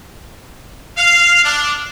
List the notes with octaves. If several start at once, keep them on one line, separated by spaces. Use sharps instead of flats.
F5
D4